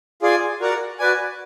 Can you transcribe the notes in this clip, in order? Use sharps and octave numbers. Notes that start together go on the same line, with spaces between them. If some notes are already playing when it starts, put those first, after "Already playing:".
F4 G#4 D5 G#5
F#4 A#4 D5 F#5
F#4 B4 D5 G#5